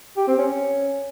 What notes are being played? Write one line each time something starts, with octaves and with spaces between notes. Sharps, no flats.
G4
C4
C#4